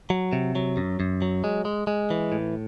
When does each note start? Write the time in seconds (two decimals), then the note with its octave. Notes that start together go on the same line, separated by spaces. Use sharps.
0.10 F#3
0.33 C3
0.55 F#3
0.77 F#2
1.00 F#2
1.22 F#3
1.44 G#3
1.65 G#3
1.87 G#3
2.10 E3
2.32 A2